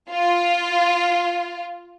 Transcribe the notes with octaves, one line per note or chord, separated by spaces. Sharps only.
F4